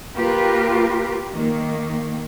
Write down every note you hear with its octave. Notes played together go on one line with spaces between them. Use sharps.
A#3 F4 G4 A#4 B4
D#3 A#3